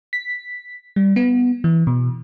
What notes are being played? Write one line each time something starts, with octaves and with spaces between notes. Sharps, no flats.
B6
G3
B3
E3
B2